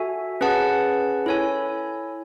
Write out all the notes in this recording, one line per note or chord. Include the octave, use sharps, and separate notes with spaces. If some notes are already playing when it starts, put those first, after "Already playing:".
Already playing: F#4 A4 E5 G#5
C#4 G#4 B4 F#5 A5
E4 A4 C#5 G#5